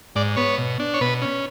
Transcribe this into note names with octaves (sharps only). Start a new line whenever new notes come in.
G#2 D5
B3 C#5
B2
D4
C#5
B2 B4
C#4